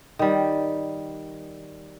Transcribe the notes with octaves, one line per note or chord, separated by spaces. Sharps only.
D#3 G3